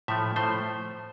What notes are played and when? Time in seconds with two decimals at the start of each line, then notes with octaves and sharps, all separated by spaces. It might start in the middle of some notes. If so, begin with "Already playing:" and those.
0.08 A2 F3 A3 E5
0.36 A2 F3 A3 C5